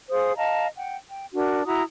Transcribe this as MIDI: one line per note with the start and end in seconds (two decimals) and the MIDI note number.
0.10 0.32 68
0.10 0.32 72
0.10 0.32 77
0.10 0.32 87
0.36 0.67 75
0.36 0.67 77
0.36 0.67 81
0.36 0.67 82
0.76 0.96 78
0.76 0.96 79
1.08 1.25 79
1.34 1.65 62
1.34 1.65 66
1.34 1.65 70
1.66 1.82 64
1.66 1.82 66
1.66 1.82 82
1.66 1.82 87